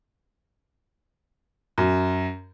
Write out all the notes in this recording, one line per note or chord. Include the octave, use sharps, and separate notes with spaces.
F#2